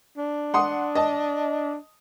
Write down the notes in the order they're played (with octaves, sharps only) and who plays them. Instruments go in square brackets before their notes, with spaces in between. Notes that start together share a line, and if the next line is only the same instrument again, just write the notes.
[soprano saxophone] D4
[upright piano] F#5 C6 D#6
D#5 A5